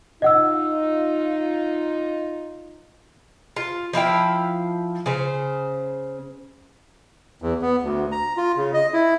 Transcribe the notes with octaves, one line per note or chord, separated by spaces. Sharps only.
D#4 F4 D#5 F#5 E6
F4
F3 E4 F5 G5
C#3 C5
E2
B3
D2
A#5
F4
C#3
D#5
E4